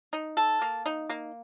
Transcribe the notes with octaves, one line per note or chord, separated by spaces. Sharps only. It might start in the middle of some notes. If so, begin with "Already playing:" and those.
D#4
A4
A#3
D#4
A#3